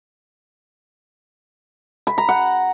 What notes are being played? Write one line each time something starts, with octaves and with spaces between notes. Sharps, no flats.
B5
A#5
F#5